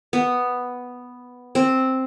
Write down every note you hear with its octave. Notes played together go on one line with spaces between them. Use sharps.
B3
C4